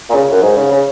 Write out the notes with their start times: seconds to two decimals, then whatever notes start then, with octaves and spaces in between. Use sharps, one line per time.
0.10 A#2
0.13 C#3
0.32 F#2
0.42 G#2
0.57 C#3
0.71 C#3